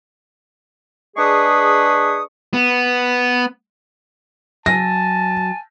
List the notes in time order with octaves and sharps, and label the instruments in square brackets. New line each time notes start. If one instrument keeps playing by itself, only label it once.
[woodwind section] G#3 D4 G#4 B4 C#6 D#6
[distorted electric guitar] B3
[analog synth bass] F#3 [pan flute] G#5 [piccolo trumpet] A5 [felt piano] A#6